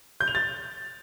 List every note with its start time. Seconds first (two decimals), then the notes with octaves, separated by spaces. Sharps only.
0.20 G6
0.28 F7
0.35 A6